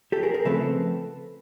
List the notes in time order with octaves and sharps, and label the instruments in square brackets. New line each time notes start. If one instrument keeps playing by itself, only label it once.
[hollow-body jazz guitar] G4 A4
G#4 A#4
G#4 A#4
C#3 F3 A3 C4 A4 B4